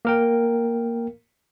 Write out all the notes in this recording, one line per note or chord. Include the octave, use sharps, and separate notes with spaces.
A#3 A#4 G5